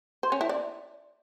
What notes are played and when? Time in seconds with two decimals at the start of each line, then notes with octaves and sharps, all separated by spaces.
0.23 C5
0.32 C#4
0.41 E4
0.49 D5